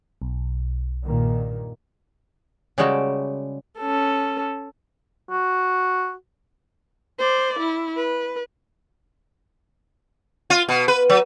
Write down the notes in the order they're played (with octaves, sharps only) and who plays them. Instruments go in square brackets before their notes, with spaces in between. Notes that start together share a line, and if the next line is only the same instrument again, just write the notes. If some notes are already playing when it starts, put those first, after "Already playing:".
[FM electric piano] B1
[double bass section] G2 A#2 D#3
[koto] C#3 G3 G#3 F#4 G5 A5
[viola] C#4 A4
[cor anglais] F#4
[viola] C5 D5
E4
B4
[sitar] F4
B2
B4
F#3